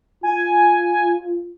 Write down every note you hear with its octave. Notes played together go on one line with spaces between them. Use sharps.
F4 G#5